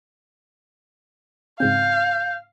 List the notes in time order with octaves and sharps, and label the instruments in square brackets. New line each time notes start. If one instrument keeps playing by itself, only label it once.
[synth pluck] G#2 C#3 C4 [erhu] F5 [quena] G6